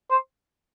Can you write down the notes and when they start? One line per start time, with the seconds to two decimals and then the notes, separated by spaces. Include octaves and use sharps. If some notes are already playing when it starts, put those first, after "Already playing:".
0.11 C5